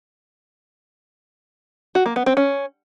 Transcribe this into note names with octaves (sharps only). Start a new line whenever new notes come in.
F#4
A#3
B3
C4
C#4